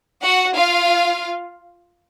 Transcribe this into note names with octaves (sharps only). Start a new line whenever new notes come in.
F#4 F#5
F4 F5